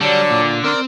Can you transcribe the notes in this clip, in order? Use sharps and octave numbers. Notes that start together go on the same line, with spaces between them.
D3 F#3 G3 D5 A5
A#2
C4 A#4 D5 C6